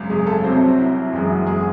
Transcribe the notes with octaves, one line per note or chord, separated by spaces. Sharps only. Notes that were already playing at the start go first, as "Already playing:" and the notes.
Already playing: G#1 F#2 C#3
G#3 G#4
A3 A4
A4
C2 C3 F#3 C4 C5
E4
F#1 F#2 E3 G#3
F#4
G#3 G#4